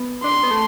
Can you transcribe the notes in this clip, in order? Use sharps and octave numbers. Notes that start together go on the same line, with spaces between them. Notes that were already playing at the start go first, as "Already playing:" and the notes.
Already playing: B3
D4 C6
B3
A3